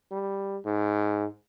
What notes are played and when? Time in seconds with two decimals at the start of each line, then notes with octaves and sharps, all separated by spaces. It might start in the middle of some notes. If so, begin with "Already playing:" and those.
0.11 G3
0.65 G#2